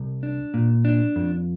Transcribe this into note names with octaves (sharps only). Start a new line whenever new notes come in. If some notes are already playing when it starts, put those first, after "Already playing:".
Already playing: C2
D4
A#2
D4
F2